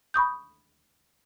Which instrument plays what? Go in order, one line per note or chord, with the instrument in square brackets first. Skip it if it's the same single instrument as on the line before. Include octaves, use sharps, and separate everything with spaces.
[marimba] B5 C#6 D#6 G6